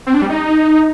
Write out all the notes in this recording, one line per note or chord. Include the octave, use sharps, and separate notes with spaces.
C4
D4
G3
D#4